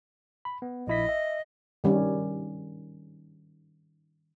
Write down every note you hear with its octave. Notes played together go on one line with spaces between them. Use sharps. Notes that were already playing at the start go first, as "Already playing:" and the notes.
B5
B3
A#1 E4 D#5 B6
E5
D#3 G3 C#4